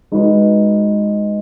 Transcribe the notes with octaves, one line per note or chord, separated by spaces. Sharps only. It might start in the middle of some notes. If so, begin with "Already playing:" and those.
G#3 D#4 F#4 B4